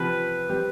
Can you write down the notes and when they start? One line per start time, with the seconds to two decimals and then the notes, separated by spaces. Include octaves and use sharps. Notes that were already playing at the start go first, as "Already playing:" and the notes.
Already playing: C3 F3 C4 G4 B4
0.49 G3 C4 G4